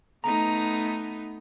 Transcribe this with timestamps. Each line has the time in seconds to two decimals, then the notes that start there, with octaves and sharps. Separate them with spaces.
0.24 A3 B3 D#4 A#5